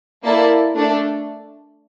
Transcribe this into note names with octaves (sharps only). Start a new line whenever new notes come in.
A#3 E4 A4 D5 A5
A3 D4 A4 D5